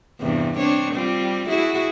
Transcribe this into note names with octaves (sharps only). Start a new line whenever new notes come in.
E2 G2 C3
C4 D4 C#5
G3 C4 F4
E4 F#4 G#4